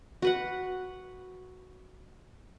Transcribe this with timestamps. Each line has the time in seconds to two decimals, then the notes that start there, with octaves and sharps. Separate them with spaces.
0.22 F#4 B4 F#5